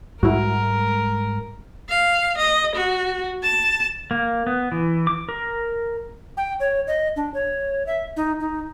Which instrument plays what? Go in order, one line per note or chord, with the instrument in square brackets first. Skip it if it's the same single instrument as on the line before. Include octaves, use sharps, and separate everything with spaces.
[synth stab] B1 E4 F#4 [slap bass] G#2 G3 G#3 [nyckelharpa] A#4
[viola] F5
D#5
F#4
A5
[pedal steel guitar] A#3
B3
E3
D6
A#4
[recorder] G5
C#5
D#5
D4
C#5
E5
D#4
D#4